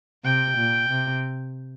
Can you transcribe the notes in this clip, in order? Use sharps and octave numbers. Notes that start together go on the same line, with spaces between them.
C3 G5
A#2
C3